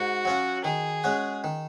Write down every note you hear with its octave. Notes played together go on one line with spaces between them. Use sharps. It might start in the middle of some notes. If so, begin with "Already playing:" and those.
Already playing: G#2 F#4
F#3 C#4 F4
D#3 G#4
G#3 C#4 F#4
D#3